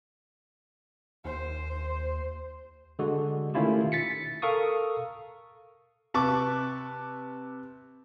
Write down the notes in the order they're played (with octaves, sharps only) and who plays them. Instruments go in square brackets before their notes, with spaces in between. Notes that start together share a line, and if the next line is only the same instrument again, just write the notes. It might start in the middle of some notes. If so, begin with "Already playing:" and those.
[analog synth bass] D#2 [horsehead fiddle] C5
[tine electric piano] D3 G#3 F#4
D#3 A3 C#4 E4 F4 G4
A6 B6 C#7
A4 A#4 F5 C#6 D#6
[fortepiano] C3 B4 A5 C#6 D6